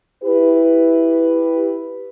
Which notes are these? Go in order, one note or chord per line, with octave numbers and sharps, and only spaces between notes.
E4 G4 B4